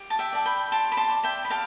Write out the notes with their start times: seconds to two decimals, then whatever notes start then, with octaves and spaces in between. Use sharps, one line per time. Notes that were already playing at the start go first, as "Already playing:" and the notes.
Already playing: G4
0.10 A5
0.19 E5 G5
0.33 D5 A5
0.45 G5 B5
0.72 G4 A5 C6
0.92 B5
0.97 A5 C6
1.10 D5
1.23 E5 G5
1.45 B5
1.50 G4 F5 A5